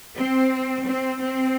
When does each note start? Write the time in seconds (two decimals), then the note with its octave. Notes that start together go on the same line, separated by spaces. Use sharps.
0.17 C4
0.86 C4
1.21 C4